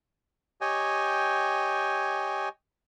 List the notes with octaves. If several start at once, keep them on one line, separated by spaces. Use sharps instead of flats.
G4 C#5 D#5 G5 G#5